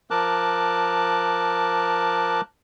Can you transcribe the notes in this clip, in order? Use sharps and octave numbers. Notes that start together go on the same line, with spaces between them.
F3 A#4 A5 D6 F#6